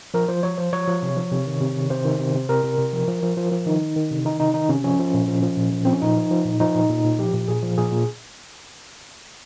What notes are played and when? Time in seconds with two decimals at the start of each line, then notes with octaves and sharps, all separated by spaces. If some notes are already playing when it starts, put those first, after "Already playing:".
0.14 F3 A#4
0.28 F3 C5
0.43 F3 C#5
0.58 F3 C5
0.72 F3 C#5
0.88 F3
1.03 C3
1.17 F3
1.31 C3
1.47 D#3
1.61 C3
1.76 D#3
1.90 C3 C5
2.05 D#3
2.19 C3
2.35 C3
2.49 C3 A#4
2.64 C3
2.78 C3
2.93 F3
3.08 F3
3.22 F3
3.37 F3
3.52 F3
3.66 D#3 D#4
3.81 D#3
3.96 D#3
4.11 C3
4.25 D#3 D#4
4.40 C3 D#4
4.54 D#3 D#4
4.69 C3 C#4
4.84 F3 C#4
4.99 F3
5.14 A#2
5.28 F3
5.43 F3
5.57 A#2
5.72 F3
5.85 F3 C4
5.93 C#4
6.02 A#2 D#4
6.16 F3
6.31 F3
6.45 A#2
6.60 F3 D#4
6.75 A#2
6.90 A#2
7.04 A#2
7.19 F3 G4
7.34 A#2
7.48 A#2 G#4
7.63 F3
7.78 A#2 G#4
7.92 A#2